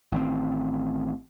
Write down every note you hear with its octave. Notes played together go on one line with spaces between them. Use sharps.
A1 D#3 B3 C4